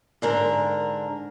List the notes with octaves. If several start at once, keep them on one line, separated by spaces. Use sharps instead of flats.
G#2 D3 A#4